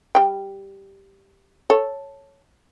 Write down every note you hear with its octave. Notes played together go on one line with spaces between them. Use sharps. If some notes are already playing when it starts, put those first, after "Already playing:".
G3 G5
A4 C#5